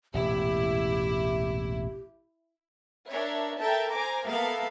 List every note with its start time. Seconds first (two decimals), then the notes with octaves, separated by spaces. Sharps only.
0.14 E1 A1 A#2 E4 G4
3.09 D4 A#4 C#5 E5
3.58 A4 A#4 E5 G5 A5
3.92 C5 G#5 A#5 D6
4.26 A#3 B3 A4 A#4 E5 F5